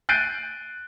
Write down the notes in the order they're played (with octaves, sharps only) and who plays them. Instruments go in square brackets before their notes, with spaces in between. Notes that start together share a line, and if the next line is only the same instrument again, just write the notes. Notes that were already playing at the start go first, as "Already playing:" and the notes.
[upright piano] F#6 G6 A6 C7 D7 D#7